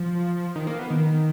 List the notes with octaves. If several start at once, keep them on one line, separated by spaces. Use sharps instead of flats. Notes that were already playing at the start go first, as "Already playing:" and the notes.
Already playing: F3
D#3
A#3
B3
D#3